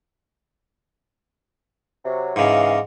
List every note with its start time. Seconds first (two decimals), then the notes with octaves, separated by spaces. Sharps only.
2.04 C3 F#3
2.36 G#2 C#3 E3 D#5 F5 D6